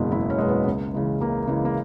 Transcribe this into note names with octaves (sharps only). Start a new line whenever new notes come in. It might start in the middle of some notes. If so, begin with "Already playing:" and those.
Already playing: F#1 E2 B2 G#3 E4
F#1 E4
C#4
E2 B2 G#3
B3
C#2
C#3 E3 G#3
C#2 A#3
C#3 E3 G#3
A#3